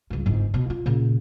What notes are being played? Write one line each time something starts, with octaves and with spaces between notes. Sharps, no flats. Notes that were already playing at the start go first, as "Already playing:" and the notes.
C#2 G2
G1 G#2
B2
F4
A#2 C#3